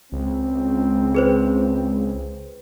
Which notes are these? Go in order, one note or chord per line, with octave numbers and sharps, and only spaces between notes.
C#2 C4
G#4 B4 C5